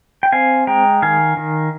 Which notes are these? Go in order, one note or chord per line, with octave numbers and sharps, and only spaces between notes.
G5
C4 F5 G#5
G#3 G5 A#5
D#3 F5 G#5
D#3